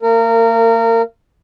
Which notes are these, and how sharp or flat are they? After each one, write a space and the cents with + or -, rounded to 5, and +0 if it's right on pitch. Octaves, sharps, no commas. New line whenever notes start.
A#3 -40 A#4 -25